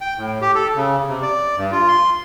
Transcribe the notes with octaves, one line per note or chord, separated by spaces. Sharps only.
G5
A2
G4
A4
C#3
C3
D5
G2
F4
C6